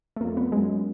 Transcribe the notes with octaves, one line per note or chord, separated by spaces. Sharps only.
A3
F2 A#3
B3
F#2 G#3